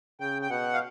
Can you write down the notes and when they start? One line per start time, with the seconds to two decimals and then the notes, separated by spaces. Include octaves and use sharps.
0.20 C#3 G5
0.42 G5
0.50 B2 F#5
0.74 F5